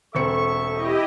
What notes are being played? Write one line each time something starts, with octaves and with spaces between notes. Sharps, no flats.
E1 C4 A4 E5 C#6 C#7
E4 G4 D#5